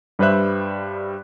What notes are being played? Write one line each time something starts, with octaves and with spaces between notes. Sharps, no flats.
G2 G3 B4 C5 E5 F#6